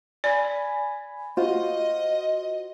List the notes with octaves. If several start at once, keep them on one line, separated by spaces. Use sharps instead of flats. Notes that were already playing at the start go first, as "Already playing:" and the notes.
D5 G#5 B5
F4 F#4 C5 D#5